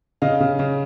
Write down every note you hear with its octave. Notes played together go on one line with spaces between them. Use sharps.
C#3 D#5 F5
C#3
C#3